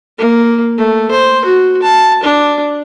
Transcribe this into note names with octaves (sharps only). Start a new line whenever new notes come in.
A#3
A3
C5
F#4
A5
D4